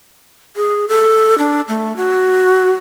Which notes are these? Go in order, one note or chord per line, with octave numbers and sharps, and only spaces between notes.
G#4
A4
D4
A3
F#4